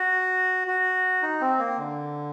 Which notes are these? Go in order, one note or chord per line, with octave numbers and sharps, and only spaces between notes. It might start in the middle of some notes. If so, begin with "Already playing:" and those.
Already playing: F#4
F#4
D#4
C4
A#3
D3